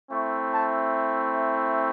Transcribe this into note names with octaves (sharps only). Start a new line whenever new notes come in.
A3 C4 E4 C#6
A5